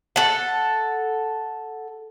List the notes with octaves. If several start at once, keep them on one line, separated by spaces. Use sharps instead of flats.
A4 F#5